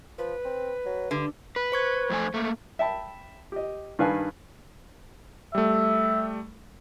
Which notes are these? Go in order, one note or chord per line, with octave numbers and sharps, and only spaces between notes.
F3 B4
C4
F#3
G2 D3
B4
C5 C#6 G#6
F2 A3 G#5
A3 A#3
E5 G5 A5 B5
G4 D#5
G2 D#3 B4 F5 G#5 A5
G3 A3 E5